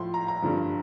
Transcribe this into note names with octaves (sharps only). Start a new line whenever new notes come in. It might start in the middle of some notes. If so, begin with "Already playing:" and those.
Already playing: A2 F3 C6
A#5
A#5
G2 D3 F3